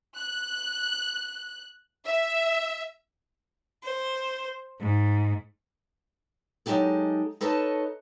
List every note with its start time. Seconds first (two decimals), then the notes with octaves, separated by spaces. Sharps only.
0.16 F#6
2.05 E5
3.83 C5
4.80 G#2
6.66 F#3 G#3 C4 D#4 G4 A4
7.41 D#4 A4 B4 C#5 D#5 A5